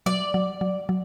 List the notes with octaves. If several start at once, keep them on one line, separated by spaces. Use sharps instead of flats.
F#3 D5
F#3
F#3
F#3